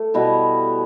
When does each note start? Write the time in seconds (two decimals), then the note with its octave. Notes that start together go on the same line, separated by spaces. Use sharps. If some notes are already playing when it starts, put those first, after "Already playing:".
Already playing: A3
0.14 B2 G3 B3 E4